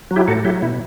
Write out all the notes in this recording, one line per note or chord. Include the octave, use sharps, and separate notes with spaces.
F#3
E4 G4
A2 F#4 A4
F#3 E4 G4
B2 E4